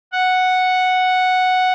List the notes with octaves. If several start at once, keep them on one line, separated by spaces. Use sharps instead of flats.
F#5